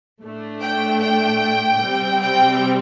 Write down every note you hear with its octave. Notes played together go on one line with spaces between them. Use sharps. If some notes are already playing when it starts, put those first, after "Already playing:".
A2 A3 D4
G5
G5
C3 G3 C4
G5